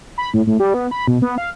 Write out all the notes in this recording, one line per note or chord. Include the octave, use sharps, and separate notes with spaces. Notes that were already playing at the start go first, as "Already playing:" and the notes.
B5
A2
A2
G3
B3
B5
B2
B3
F5